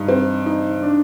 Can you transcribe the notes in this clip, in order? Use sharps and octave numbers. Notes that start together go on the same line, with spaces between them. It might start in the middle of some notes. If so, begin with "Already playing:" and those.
Already playing: G2 D#4
C4
D#4
D4